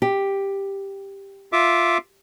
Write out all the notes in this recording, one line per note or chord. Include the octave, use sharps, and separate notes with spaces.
G4
F4 E5 D6